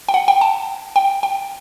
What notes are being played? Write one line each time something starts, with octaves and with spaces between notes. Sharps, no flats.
G5
F#5
G5
A5
G5
G5